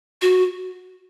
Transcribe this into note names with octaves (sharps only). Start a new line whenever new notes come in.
F#4